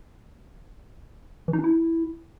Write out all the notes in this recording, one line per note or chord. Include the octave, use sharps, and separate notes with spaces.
E3
D#4
D4
E4